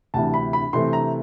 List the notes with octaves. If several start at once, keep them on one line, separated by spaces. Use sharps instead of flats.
D2 C3 E3 A5
B5
B5
C3 E3 A3 C4 C6
A#5